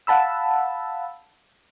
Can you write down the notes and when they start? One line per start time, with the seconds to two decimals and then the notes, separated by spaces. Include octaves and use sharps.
0.07 F5 F#5 A5 B5 E6